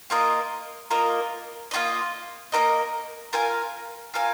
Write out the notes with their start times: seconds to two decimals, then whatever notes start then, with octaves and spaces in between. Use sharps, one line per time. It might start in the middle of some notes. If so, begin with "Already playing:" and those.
0.10 A#3 F4 A#4 D#5
0.90 A#3 F4 A#4 D#5
1.71 A#3 F4 A#4 D#5
2.52 A#3 F4 A#4 D#5
3.33 F4 A#4 F5 G#5
4.14 F4 A#4 F5 G#5